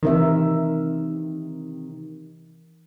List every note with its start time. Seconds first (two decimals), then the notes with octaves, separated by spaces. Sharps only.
0.03 C3 D#3 E3 A#4 E5